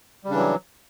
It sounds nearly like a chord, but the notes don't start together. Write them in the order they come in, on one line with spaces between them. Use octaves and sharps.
G3 C#3 D4 E3 F#3